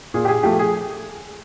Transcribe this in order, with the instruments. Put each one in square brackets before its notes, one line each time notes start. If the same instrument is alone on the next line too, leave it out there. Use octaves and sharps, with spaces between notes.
[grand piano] A#2 [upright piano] G#4
[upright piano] G4
G#4
[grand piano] F3 A3 [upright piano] G4
[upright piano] G#4